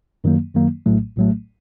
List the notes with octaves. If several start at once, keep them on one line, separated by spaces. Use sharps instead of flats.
F#2 D#3 F#3 A#3
F#2 D#3 F#3 A#3
A#1 A2 F#3 A3
A#1 A2 F#3 A3